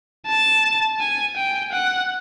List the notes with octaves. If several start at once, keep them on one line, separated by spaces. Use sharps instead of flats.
A5
G#5
G5
F#5